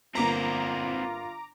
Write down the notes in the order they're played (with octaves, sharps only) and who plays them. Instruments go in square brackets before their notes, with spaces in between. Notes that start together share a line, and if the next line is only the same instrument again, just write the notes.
[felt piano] G1 A#3 B6 [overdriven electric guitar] C4 A#4 [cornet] F4 [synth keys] A#5 D6